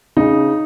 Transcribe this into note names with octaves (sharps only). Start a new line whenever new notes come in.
C#3 D#4